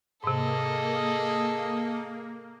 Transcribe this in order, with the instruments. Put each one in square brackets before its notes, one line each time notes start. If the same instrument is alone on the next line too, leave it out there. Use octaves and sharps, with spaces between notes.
[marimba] G#2 C3 [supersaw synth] A#3 [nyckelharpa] G#4 [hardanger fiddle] A4 D#5